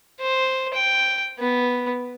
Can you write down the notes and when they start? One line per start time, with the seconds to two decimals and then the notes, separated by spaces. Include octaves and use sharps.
0.20 C5
0.73 G5
1.39 B3